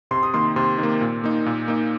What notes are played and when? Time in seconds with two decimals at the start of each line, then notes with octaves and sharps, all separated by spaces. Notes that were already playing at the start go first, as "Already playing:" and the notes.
0.11 C3 C6
0.23 D#6
0.34 D#3 A#3 C6
0.56 C3 C6
0.78 D#3 A#3
1.01 A#2
1.24 A#3 D#4
1.46 A#2
1.68 A#3 D#4